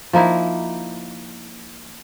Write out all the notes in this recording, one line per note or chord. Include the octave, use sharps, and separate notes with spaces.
F3 A#3 D#4 E4